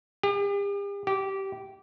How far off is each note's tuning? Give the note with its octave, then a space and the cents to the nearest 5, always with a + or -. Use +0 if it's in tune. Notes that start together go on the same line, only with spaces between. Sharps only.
G4 +45
G4 -15